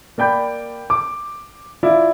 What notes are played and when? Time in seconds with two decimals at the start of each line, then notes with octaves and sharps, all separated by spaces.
0.18 A#3 D5 G5 B5 G6
0.90 D6
1.83 E4 F4 D5